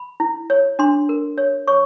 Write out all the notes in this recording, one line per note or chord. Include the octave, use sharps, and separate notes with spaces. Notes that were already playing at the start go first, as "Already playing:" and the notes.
Already playing: B5
E4
C#5
D4 C6
A#4
C#5
C#5 C#6